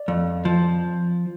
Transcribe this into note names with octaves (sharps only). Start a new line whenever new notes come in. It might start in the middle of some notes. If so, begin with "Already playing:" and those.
Already playing: D5
F2
F3